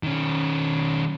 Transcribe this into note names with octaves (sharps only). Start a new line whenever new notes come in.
D#3 C#4